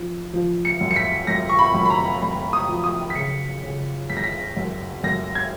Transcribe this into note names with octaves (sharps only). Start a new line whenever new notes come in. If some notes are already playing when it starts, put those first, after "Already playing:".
Already playing: F3
F3
C#7
F#2
C#7
B6
F#2 A#6
C#6
B5
F#2
B5
A#5
F#2 B5
D#6
F3
D#6
B6
C#3 C#7
C#3
F#2 B6
A#6
B6
F#2
F#2 A#6
G#6